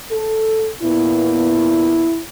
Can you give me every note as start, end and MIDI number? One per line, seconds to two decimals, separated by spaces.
0.11 0.68 69
0.83 2.11 46
0.83 2.11 59
0.83 2.21 64